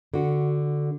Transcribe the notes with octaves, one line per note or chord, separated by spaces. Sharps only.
D3 F#4